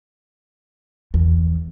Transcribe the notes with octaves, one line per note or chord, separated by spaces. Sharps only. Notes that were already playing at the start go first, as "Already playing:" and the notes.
E2